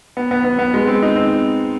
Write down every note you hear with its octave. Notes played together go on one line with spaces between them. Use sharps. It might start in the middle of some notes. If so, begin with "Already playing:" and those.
B3
B3
B3
B3
G#3
C4
D#4
C4